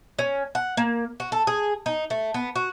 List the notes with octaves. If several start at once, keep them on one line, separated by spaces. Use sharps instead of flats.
C#4
F#5
A#3
F#4
A4
G#4
D#4
A3
B3
F#4